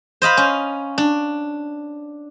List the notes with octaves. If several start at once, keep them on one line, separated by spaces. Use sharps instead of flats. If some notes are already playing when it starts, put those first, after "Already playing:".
C5 D#5 F5 B5
C#4
D4